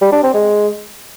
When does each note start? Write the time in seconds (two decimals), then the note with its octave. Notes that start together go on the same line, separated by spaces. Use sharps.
0.01 G3
0.12 D4
0.23 C4
0.34 G#3